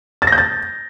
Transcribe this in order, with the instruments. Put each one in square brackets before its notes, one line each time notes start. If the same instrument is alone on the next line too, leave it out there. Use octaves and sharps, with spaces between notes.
[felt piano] A6
A#6
G6
A6